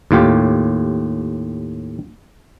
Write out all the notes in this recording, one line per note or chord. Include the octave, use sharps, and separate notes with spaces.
D#2 A2 F4 G4